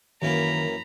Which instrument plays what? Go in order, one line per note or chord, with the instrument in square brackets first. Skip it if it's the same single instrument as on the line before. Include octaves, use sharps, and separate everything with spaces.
[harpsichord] F#2 E3 A#3 [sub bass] D#3 [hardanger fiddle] A#5 B5